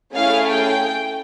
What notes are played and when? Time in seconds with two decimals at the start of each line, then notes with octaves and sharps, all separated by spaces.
0.15 A3 C#4 E4 G#4 F5
0.48 G5